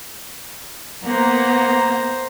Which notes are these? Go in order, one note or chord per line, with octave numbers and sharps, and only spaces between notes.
A#3 B3 C5 A#5